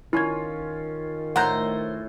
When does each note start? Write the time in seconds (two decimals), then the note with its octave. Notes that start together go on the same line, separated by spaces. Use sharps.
0.13 D#3 C#4 E4 F4 G#6
1.36 A2 C5 F#5 A#5 F#6 G6